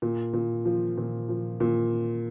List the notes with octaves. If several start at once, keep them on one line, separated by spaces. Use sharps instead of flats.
A#2
A#2
F3
A#2
F3
A#2